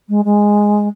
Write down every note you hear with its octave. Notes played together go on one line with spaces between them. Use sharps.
G#3
G#3